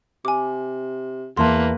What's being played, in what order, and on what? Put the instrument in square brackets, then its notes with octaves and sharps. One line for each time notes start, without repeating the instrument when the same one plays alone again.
[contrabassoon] C3 [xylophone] G#5 D6
[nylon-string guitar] E2 E3 A5 [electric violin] A#3 B4 [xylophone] C6